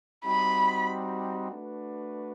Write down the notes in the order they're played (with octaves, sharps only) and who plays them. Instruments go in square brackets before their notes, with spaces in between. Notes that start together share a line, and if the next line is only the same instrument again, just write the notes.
[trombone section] G3 C4 D#4 F#4 [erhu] B5
[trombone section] A3 D4 F#4 B4